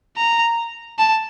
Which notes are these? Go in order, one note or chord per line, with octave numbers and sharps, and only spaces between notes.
A#5
A5